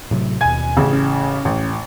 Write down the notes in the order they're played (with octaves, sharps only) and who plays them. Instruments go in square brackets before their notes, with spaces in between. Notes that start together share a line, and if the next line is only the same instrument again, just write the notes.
[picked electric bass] A2 C3 F#3
[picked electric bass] D#2 B2 [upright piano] G#5 G#6
[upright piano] A1 C#3
[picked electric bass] C#4
[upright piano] A1